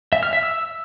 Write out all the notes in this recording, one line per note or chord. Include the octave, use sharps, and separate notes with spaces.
E5
F6
E5
E6